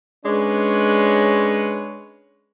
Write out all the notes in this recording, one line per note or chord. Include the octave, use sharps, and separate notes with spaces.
G#3 C#4 D4 B4 C#5